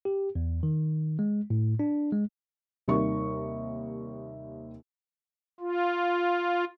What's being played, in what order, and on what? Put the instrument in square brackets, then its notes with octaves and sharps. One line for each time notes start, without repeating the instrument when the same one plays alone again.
[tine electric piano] G4
E2
D#3
G#3
A2
D4
G#3
[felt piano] D#2 C3 G3 A#3 D#4 C#6
[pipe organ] F4